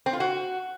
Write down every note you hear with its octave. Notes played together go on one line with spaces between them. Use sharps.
C4
F4
F#4